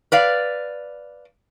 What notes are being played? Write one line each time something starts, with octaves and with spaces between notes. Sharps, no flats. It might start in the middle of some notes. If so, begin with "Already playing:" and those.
B4 D5 F5